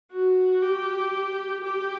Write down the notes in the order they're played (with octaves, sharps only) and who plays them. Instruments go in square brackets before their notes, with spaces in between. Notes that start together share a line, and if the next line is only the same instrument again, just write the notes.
[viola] F#4
G4
G4